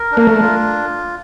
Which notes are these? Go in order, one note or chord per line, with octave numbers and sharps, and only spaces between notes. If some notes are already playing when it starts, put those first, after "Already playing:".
Already playing: A#4
D4
A#3
A3
F4